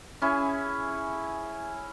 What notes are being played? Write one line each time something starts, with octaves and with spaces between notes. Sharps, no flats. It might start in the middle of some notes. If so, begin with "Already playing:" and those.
C#4 E4 G#4